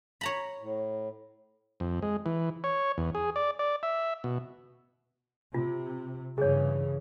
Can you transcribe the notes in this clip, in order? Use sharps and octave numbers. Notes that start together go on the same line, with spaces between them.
C#5 A#5 B5
A2
F2
G#3
E3
C#5
E2
G#4
D5
D5
E5
B2
C3 F4
G2 C#3 E3 G#4 C#5